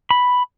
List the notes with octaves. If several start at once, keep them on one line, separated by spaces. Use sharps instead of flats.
B5